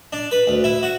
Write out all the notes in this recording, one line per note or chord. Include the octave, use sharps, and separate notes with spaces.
D4
B4
D2
E4
F#4